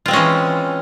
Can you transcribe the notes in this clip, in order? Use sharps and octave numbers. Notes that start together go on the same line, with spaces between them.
E3 G#3 C4 C#4 F4